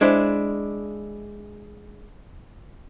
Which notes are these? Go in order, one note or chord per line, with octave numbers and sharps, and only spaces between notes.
G#3 D4 E4 C5